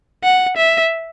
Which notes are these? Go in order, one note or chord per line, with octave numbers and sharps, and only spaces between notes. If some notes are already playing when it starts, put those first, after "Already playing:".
F#5
E5